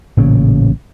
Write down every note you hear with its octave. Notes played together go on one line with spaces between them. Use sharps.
A1 A#2 C#3